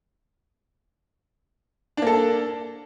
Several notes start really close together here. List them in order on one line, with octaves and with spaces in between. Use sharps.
D4 A#3 A4